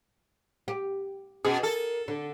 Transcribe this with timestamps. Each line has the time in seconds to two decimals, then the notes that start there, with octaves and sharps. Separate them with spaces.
0.68 G4
1.45 B2 C#4 G#4
1.63 A4 A#4
2.08 D3 D4